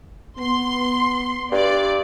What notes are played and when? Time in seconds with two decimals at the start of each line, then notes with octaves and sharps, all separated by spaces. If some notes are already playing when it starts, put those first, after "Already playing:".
0.38 B3 C6
1.52 G2 D5